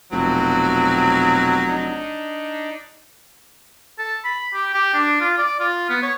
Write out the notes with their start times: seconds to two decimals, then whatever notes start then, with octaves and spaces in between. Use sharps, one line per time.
0.12 F1 B2 F#3 C4
1.68 D4 D#4
3.99 A4
4.25 B5
4.54 G4
4.74 G4
4.94 D4
5.20 F4
5.38 D5
5.60 F4
5.90 B3
6.03 C#5